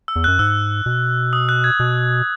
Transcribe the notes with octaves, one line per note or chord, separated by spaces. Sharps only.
E6
E2
F#6
F#2
G#2 E6
B2
D#6
F#6
G#6
B2